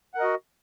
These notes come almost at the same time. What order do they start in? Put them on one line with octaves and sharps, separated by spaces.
F#5 A#4 D#5 F#4